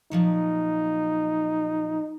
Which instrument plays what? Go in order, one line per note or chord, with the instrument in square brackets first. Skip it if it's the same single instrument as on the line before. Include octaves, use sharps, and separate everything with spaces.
[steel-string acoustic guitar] A#2 F3 F#3 [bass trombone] D#4